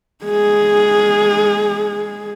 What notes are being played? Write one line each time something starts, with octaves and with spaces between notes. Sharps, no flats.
G#3 G#4